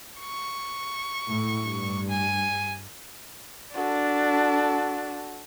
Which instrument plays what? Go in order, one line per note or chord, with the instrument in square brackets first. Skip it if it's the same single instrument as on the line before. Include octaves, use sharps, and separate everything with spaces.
[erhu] C#6
[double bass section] A2
G2
[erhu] G#5
[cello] D4 [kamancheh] F#4 A4